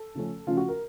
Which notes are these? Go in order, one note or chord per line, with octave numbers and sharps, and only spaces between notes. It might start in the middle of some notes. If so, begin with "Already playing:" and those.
Already playing: A4
C#3 F3 A3 C#4
C#3 F3 A3 C#4 F4
F#4
A#4